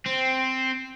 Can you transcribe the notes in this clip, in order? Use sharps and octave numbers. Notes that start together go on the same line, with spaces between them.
C4